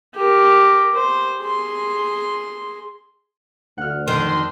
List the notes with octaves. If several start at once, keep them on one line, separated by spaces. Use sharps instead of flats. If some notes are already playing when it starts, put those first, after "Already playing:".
G4 A#4
C5
G#4 C6
D2 F#5 F6
F2 D#3 D4 C5 C6